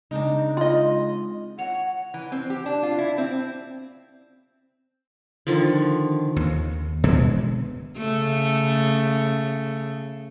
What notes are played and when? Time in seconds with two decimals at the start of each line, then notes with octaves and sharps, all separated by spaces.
0.11 C#3 G#3 C4 D4 D#4
0.57 F4 D#5
1.59 C#5 F#5
2.14 E3
2.32 C4
2.50 G4
2.66 D4
2.83 F4
2.98 E4
3.18 C4
5.47 D3 D#3 F3
6.36 D#2
7.04 B2 D3 F3 G#3
7.98 C#3 A3